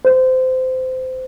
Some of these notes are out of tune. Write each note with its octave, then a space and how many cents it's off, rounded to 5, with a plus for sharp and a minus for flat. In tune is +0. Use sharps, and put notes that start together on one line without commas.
C5 -20